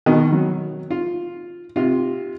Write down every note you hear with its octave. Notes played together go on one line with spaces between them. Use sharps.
B2 D#3
F#3
F4
C3 F4